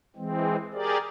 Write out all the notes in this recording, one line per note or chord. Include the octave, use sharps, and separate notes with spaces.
E3 G#3 C4
G4 G#4 A#4 D5